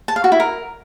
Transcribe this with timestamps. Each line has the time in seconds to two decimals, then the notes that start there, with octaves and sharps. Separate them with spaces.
0.08 A5
0.16 F5
0.24 F#4
0.32 E4
0.40 A#4